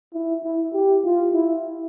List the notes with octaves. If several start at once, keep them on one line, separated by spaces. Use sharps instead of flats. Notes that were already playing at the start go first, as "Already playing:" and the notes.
E4
E4
G4
F4
E4